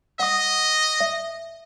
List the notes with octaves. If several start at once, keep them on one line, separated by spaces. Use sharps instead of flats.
D#5 F#5 D#6
E5